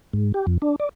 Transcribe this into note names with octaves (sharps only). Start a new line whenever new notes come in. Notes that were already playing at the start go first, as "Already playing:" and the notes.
G#2
G4
F2
D4
D5